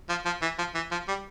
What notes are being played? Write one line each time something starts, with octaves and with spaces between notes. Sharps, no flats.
F3
F3
E3
F3
E3
F3
G3